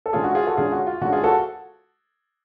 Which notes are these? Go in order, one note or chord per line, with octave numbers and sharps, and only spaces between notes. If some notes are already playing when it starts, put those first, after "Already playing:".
A4
D3 G#3 C#4 F4 G#4
F#4
F4 G#4
F#4 A4
D3 G#3 C#4 F4 G#4
F#4
F4
D3 G#3 C#4 F#4
F4 G#4
F#4 A4